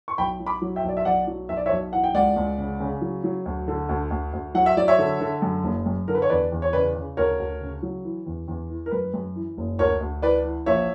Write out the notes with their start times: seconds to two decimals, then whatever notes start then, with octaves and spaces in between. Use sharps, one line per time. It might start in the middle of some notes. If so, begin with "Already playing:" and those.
0.08 C#6
0.18 B1 G5 B5
0.40 F#3
0.46 B5 D6
0.62 F#3
0.76 E5 G5
0.84 B1 D5
0.97 E5
1.05 B1 D5 F#5
1.27 F#3
1.49 B1 E5
1.57 D5
1.66 C#5 E5
1.71 B1
1.92 E3 F#5
2.04 G5
2.14 C#2 D5 F#5
2.36 C#2
2.58 C#3
2.80 C#3
3.01 F#3
3.24 F#3
3.46 D2
3.68 D3
3.89 D2
4.11 D2
4.33 D2
4.54 F#3 F#5
4.66 E5
4.77 F#3 D5
4.88 C#5 E5
4.99 D3
5.21 D3
5.42 F#2
5.64 F#1
5.86 F#2
6.08 D3 A#4
6.15 B4
6.22 C#5
6.29 E2 B4 D5
6.52 E2
6.62 C#5
6.73 C#3 B4 D5
6.95 C#3
7.17 D2 A#4 C#5
7.39 D2
7.61 C#3
7.82 F#3
8.04 E3
8.26 E2
8.48 E2
8.70 E3
8.86 A#4
8.91 F#2 B4
9.14 F#2
9.36 E3
9.57 F#1
9.79 D2 A#4 C#5
10.01 D2
10.22 E3 B4 D5
10.45 E3
10.66 A#1 C#5 E5